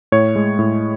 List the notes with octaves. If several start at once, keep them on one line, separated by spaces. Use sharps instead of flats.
A2 C#5
G#3
A2